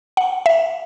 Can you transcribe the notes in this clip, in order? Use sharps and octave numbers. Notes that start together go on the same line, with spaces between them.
F#5
E5